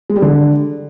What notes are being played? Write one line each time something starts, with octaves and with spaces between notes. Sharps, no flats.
G#3
G3
D3